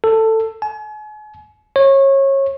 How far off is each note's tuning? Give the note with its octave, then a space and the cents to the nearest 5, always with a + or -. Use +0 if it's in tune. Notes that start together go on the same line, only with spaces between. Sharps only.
A4 +15
G#5 +40
C#5 -25